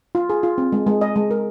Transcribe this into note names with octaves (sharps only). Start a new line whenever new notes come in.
F4
G#4
F4
C4
G#3
G#3
D#5
G#3
A#4